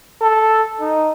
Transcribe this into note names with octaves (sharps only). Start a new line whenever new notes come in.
A4
D#4